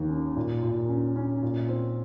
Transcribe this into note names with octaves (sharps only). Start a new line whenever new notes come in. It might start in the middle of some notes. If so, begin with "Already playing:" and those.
Already playing: D#2 D#3
C#4
A#2
A#2
C#4
C#4
A#2
C4